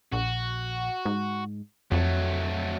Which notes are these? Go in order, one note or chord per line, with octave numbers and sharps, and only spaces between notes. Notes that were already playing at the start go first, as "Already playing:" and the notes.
A#1 F#4
G#2
F2 F#3 A3